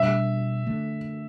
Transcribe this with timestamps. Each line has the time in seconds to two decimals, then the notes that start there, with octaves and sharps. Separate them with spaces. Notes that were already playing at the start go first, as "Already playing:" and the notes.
Already playing: B2 G3 D4 E5
0.66 D3 A3